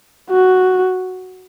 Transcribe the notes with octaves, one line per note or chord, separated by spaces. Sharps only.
F#4